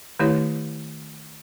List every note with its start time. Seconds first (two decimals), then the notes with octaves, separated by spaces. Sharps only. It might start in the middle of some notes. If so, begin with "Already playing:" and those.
0.19 D#3 A3 E4 G4 C#5